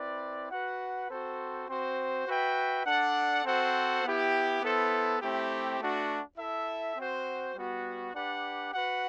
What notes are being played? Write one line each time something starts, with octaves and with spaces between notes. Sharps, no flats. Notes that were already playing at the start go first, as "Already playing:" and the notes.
Already playing: C4 E4 B4 D5
F#4 B4 F#5
C4 F#4 A4 C5
C4 F#4 C5
F#4 B4 E5 G5
D4 A4 D5 F#5
C4 F#4 A4 C5 F#5
B3 E4 G4
B3 E4 A4 C5
A3 C4 E4 G4
A3 D4 F#4
E4 A4 E5
C4 F#4 C5 F#5
G3 B3 F#4
D4 G4 B4 D5 F#5
F#4 B4 F#5